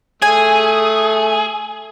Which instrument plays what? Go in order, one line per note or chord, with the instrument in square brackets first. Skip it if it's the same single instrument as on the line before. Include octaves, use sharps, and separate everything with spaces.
[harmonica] A3 [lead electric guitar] G#4 [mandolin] G#5